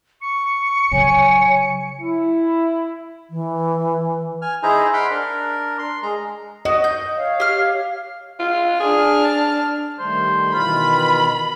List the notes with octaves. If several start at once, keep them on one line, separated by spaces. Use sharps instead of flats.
C#6 C#7
C#3 F#3 C#5 G#5
E4
E3
G#5 F6
D#4 E4 G#4 C5 A#5
F#5 B5 C6 D6 F6
D4 A#4
C6
G#3 A#5
F#4 D#5
G6
C#5 F5
G4 F6
F4
D4 G#4 F6
A5
D#3 G3 A3 C5
B2 D#3 E3 F4 B5